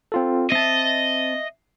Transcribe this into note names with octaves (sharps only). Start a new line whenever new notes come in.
C4 F4 A4
C4 D#5 E5 A5